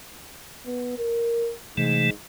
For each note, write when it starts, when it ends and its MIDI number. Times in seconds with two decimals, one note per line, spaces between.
0.66 0.94 59
0.98 1.52 70
1.77 2.12 44
1.77 2.10 48
1.77 2.10 52
1.77 2.10 57